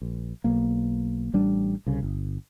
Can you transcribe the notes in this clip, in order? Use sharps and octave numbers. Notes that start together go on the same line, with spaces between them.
A#1
B1 A#3
A1 G3 D4
C2 C#3
G1